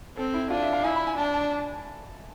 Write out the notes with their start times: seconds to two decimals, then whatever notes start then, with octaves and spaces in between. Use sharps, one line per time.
0.17 C4 A4
0.34 E4
0.50 D4 F4
0.63 E5
0.73 F5
0.84 E4 G#5
0.96 B5
1.07 G#5
1.18 D4 A5
1.34 A5